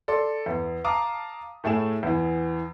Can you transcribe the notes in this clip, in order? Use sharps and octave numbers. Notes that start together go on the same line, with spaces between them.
A4 D5 C6
E2
F5 A5 A#5 D6 D#6
A2 A3 E4 G#4 E7
E2 E3